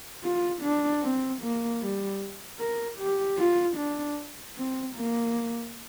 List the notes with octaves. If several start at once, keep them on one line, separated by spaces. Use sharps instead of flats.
F4
D4
C4
A#3
G3
A#4
G4
F4
D4
C4
A#3